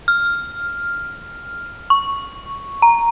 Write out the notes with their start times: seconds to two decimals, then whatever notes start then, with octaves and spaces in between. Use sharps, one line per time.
0.08 F6
1.90 C#6
2.82 A#5